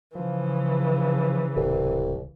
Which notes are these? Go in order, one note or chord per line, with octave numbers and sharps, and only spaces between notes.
C#3 E3 F3
D1 C2